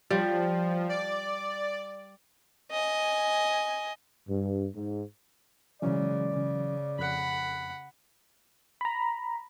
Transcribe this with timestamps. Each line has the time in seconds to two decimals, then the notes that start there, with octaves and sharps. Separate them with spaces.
0.10 F3 G3
0.89 D5
2.71 D#5 G#5
4.28 G2
4.75 G#2
5.82 C#3 E3 F#3 G#3 C#4 D5
6.31 C#3
6.99 F2 F#5 B5 F#6
8.81 A#5 B5